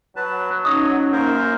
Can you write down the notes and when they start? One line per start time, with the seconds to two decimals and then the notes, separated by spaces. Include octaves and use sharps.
0.16 F#3 B4 A5
0.65 C#4 D#4 C#5 D#5 D#6
1.12 F#2 A#3 A#4 C5